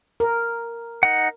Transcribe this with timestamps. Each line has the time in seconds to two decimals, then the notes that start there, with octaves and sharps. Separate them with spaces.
0.20 A#4
1.03 D#4 F#5